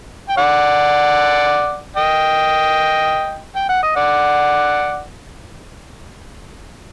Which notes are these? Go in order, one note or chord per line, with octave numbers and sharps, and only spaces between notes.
G5
D5 F#5
D#5 G5
G5
F#5
D#5
D5 F#5